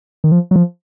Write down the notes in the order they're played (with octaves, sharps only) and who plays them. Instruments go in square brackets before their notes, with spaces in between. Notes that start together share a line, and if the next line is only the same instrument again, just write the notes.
[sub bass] D#3
F3
F#3
F3